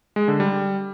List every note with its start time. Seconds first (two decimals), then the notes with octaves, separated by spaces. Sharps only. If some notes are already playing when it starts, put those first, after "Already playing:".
0.16 G#3
0.28 D3
0.40 G3